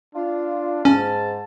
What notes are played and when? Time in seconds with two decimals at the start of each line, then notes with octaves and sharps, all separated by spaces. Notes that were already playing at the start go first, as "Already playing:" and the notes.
0.15 D4 F4
0.85 G#2 C#4 A5